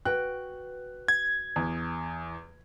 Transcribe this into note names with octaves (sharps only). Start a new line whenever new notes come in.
F#4 B4 G5 F#6
G#6
E2